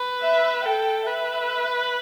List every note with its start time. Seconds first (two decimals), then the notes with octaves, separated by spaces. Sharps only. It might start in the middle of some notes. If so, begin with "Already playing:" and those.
Already playing: B4
0.24 E5
0.65 A4 G5
1.07 B4 E5